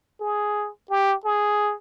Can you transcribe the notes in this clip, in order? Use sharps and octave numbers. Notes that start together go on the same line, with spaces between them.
G#4
G4
G#4